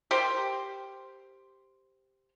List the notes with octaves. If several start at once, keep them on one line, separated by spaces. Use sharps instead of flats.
G4 A#4 C5